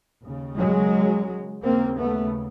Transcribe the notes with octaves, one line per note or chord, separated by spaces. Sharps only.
D#2 C#3
F#3 G#3
D#2 C#3 A#3 C4
A3 B3